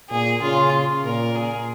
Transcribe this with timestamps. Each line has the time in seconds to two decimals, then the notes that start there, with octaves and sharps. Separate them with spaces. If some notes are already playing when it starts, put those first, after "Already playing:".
0.10 A#2 G#4
0.42 C#3 F4
1.04 A#2 A#4
1.35 G#4